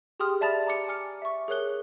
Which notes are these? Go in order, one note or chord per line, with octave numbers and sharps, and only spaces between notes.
G4 G#4 G5 C6 D#6 F6
D5 E5 A5 B5 A6 F7
A#5 D6 C#7
G#5 D6 F6 C#7
E5 C#6
G#4 A#4 C#5 F#6 G7